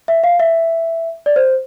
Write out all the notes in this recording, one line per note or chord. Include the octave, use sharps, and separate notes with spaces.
E5
F5
E5
D5
C5